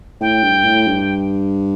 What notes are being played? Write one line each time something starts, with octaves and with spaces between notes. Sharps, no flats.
A2 G5
G2
A2
G2